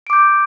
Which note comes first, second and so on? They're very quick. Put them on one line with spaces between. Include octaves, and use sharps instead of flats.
D7 D6 G6